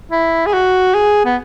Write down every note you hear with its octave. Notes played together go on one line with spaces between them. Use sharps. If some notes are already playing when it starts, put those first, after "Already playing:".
E4
G#4
F#4
G#4
B3